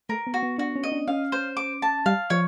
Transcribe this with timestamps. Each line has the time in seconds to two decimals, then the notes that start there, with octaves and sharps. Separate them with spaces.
0.09 A3 A#4
0.27 B3
0.34 F#4
0.43 B3
0.58 D4 F#4
0.76 C#4
0.83 D#5
0.92 D4
1.08 C#4 F5
1.32 C5
1.57 D6
1.82 A5
2.06 G3 F5
2.30 F3 C#5